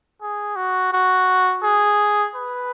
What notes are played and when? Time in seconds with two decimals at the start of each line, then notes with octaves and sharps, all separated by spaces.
0.21 G#4
0.56 F#4
0.93 F#4
1.63 G#4
2.35 B4